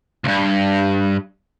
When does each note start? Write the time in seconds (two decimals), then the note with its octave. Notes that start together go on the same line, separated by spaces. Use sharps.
0.24 C#2 G2